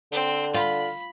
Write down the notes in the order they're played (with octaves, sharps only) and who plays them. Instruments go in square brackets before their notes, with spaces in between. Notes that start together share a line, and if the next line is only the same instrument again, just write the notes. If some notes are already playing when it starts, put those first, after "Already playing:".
[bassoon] D3 [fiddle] C4
[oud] F4 [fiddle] B5